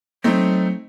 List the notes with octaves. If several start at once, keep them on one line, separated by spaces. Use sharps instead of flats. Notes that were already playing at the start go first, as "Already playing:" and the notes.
F#3 A3 C4 D#4